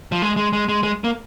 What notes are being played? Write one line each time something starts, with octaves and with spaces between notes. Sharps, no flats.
F3
G#3
G#3
G#3
G#3
G#3
A#3